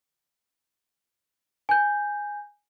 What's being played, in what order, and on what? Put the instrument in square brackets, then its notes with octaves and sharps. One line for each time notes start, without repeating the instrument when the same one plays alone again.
[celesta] G#5 G6